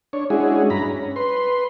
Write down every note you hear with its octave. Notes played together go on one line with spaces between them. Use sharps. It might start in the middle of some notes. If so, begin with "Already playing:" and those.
D4 C#5
G#3 C#4 D4 E4 F#4 G#4
G2 A#5 B5
C#4
B4 C6